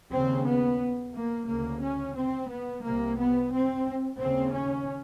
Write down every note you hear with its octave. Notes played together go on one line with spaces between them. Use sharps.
D#2 C#3 C4
B3
A#3
D2 C#3 A#3
C#4
C4
B3
C2 C3 A#3
B3
C4
D#2 C#3 C4
C#4